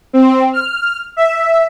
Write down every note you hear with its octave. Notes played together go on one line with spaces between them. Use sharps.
C4
F6
E5